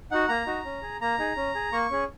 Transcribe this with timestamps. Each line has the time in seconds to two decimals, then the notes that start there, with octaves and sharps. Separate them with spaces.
0.11 D#4 F#4 F#5
0.28 A#3 A#5
0.47 D#4 F#4
0.65 C#4
0.82 G#4
1.01 A#3 A#5
1.19 D#4 G#4
1.37 C#4
1.55 G#4
1.73 A#3 C#6
1.90 C#4 G#4